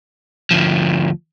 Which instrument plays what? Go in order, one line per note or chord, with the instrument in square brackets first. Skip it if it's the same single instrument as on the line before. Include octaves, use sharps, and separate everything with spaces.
[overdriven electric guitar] D2 F3